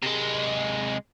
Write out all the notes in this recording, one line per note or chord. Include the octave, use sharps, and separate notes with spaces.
C3 G#3